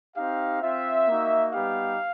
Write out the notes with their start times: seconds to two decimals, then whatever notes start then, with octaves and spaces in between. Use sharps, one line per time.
0.16 C4 D#4 G4 F5
0.62 C4 F4 E5
1.08 A#3 D#4 F#4
1.54 G3 B3 D#4 G4 F5